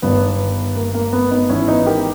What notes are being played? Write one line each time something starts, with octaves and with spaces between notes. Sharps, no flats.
G1 G2 D#3 B3
A#3
A#3
B3
B3 D#4
G#1 G#2 E3 C#4 E4
B3 D#4
G4 A#4